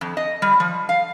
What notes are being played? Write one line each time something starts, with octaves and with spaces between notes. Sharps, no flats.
F2
D#5
G3
F3
F5